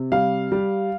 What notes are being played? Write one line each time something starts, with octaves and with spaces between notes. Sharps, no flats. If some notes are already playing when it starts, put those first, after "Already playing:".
Already playing: C3
G3 F5
G3